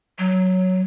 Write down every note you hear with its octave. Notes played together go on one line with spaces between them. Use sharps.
F#3